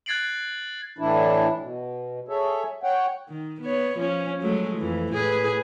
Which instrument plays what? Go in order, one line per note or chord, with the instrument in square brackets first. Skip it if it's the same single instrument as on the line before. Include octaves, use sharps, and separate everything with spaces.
[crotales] F#6 G#6 A6 C7 D7 F#7
[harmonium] A2 E3 D4 E4
B2
G#4 A4 C#5 E5
C#5 F#5 G5
[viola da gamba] D#3
B3 C#5
F3 C#4
F#3 G#3 A3
F2 E3
A2 G#4 B4